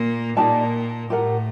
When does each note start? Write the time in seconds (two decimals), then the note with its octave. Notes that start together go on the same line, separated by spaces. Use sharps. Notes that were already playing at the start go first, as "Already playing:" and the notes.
Already playing: A#2 A#3
0.37 A#2 A#3 D#4 G4 D5 A5
1.10 A2 A3 G4 A#4 F#5